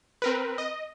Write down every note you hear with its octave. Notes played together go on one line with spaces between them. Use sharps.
C4 A#4 B4
D#5